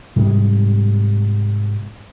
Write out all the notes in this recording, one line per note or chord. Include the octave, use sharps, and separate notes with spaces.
G#2 C3 G3 G#3